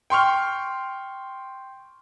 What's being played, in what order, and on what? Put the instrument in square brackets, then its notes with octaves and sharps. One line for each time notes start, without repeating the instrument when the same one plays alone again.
[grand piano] G5 C6 C#6 F6